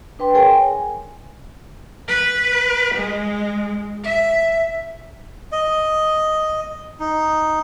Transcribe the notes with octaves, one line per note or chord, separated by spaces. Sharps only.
D4 B4 G5 C6
G#4 A#4 C#5 G5 G#5
G#5
B4
G#3
E5
D#5
D#4